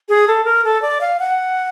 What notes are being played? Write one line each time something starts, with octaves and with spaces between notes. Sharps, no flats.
G#4
A4
A#4
A4
D5
F5
F#5